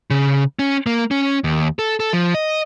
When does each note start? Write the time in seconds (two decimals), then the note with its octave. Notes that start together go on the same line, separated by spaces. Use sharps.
0.10 C#3
0.59 C#4
0.86 A#3
1.11 C#4
1.44 D#2
1.79 A4
2.00 A4
2.13 F3
2.34 D#5